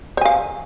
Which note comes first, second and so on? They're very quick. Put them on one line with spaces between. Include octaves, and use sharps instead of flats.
C5 G#5 F5